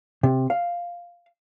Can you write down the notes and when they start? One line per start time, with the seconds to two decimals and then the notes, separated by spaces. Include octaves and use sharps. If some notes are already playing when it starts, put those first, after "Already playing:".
0.23 C3
0.50 F5